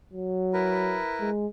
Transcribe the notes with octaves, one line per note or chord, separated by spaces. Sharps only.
F#3
E4 A#4 B4
G#3